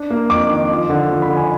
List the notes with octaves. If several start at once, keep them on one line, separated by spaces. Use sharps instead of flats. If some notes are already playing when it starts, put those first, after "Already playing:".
Already playing: D4
A#3
F2 D6
D#3
F3
D3
F3
B5
D3
G#5